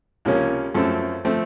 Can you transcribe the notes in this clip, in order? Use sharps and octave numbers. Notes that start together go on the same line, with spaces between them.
C#2 C3 F3 A#3 C#4
F#2 F3 A3 C4 A4
F3 A3 C4